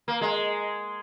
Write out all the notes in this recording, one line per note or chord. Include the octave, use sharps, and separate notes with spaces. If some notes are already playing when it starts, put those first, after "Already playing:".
A#3
G#3